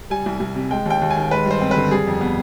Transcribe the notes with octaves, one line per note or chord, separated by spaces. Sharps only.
G3 G#5
C2
C2
C3
G#3 G5
D#2 G5
D#2
G#5
D#3
G#3 B4
G2 C5
C4
B4
D3
G3 G#4
F2
B3